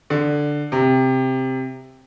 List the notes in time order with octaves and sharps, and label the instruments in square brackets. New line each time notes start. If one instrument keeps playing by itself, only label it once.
[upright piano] D3
C3